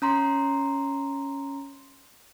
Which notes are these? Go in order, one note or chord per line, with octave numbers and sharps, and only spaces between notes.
C#4 A#5 C6